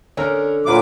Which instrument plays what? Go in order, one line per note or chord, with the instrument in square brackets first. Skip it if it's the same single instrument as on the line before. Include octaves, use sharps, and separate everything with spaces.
[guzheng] D3 [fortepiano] C#4 A#4
[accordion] A#2 F#3 D6 [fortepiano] E4 F4 B4